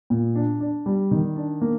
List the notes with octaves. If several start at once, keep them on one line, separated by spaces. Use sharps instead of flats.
A#2
D4
D4
G3
D#3
D4
A#3